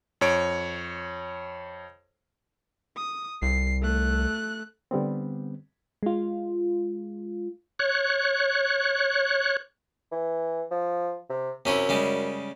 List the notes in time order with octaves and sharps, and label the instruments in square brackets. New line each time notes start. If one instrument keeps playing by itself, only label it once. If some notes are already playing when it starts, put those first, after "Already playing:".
[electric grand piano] F2 C#5 D7
[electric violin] D#6
[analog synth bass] C2 [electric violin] C7
[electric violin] A3 F#6
[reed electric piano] D3 G3 B3 C4
[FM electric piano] G#3 F4
[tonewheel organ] C#5 F#6
[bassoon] E3
F3
C3
[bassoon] F#2 [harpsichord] C3 C#4 E4
[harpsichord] C#3 G3 G#3